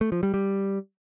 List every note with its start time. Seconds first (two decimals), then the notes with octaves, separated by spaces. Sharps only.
0.01 A3
0.12 F3
0.23 G3
0.34 G3